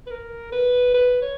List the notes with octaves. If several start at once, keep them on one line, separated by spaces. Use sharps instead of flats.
B4
A#4
B4
B4
C#5